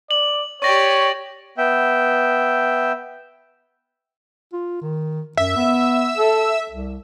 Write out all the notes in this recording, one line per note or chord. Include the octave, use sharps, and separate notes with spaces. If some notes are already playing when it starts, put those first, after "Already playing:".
D5 F#7
G4 C#5 D5 C#6 A#6
B3 E5 G5
F4
D#3
F#2 E5
B3
A4
C2